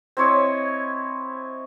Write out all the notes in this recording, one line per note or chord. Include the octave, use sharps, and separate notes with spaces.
C4 E4 C#5 D#5